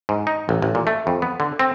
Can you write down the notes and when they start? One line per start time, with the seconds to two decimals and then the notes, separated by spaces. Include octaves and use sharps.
0.09 G#2
0.27 D#4
0.49 A1
0.62 A1
0.75 A#2
0.87 A3
1.07 F2
1.22 B3
1.40 D3
1.59 C4